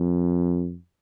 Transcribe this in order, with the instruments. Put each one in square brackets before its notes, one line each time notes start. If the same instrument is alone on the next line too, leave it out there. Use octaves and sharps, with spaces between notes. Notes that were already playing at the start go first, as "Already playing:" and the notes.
Already playing: [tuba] F2